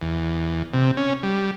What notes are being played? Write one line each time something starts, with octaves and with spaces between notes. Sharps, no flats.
E2
C3
C#4
G3